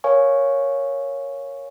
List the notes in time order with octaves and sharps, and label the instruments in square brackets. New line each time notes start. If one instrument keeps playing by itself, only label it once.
[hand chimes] A#4 C#5 F5 G#5 C#6